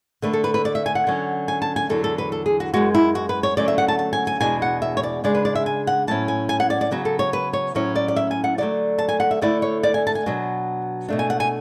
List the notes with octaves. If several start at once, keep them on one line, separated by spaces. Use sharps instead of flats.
D3 A3 D4 B4
A4
B4
B4
D5
E5
G#5
F#5
D3 F#3 C#4
G#5
A5
G#5
E2 D3 F#3 A4
A4
B4
A4
G#4
F#4
F#2 C#3 G#3 F#4
E4
F#4
B4
C#5
D3 F#3 A3 C#4 D5
E5
F#5
A5
A5
G#5
G#5
E2 B2 G#3 D4 G#5
F#5
E5
C#5
D5
C#3 G#3 D4 D5
B4
D5
E5
G#5
F#5
A2 F#3 C#4 E4 A5
G#5
G#5
F#5
D5
D5
C#3 F#3 B3 F#4
A4
C#5
B4
C#5
A2 F#3 C#4 E4 C#5
D5
D5
E5
G#5
F#5
D3 F#3 A3 D5
A5
G#5
F#5
E5
D3 A3 E4 D5
C#5
D5
G#5
A5
G#5
B2 F#3 B3 D4
B2 A3 D4
G#5
F#5
G#5